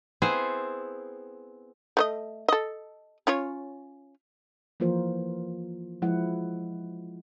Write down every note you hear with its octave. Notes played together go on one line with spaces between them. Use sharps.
B3 C4 E4 G#4 C5
A3 C5 D#5
A4 D#5
C#4 F4 C#5
E3 F3 A#3 F4 A#4 C5
F3 G#3 E4 F#5